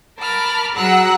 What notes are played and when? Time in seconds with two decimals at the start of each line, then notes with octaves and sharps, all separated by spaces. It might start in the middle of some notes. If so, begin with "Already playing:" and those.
0.18 A#4 A5 B5 D6 F6
0.75 F#3 G#4 F#5 A#5 E6 F#6